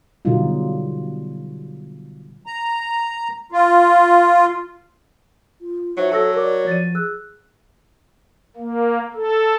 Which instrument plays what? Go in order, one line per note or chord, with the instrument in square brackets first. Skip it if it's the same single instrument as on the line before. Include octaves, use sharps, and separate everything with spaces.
[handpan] B2 D3 F#3 G3 D#4 F4
[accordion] A#5
F4
[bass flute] F4
[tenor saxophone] F#3 [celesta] D#4 C5 E5
[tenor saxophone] F#3 [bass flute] A4 [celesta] A5 E6 A#6
[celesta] A#4 D6 [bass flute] D5
[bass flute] F3 [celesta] A6 D#7
[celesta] G#4 E6 F#6
[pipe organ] A#3
A4